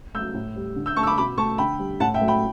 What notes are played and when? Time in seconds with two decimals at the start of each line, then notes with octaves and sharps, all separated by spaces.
0.14 A3 E6 G6
0.19 F#3
0.34 A2
0.56 G3
0.76 D3
0.86 E6 G6
0.96 A3 A5 C#6
1.03 E6
1.07 B5 D6
1.18 B2 B5 D6
1.38 A3 A5 C#6
1.58 D3 G5 B5
1.79 G3
2.00 A2 F#5 A5
2.14 E5 G5
2.21 F#3 A3
2.28 G5 B5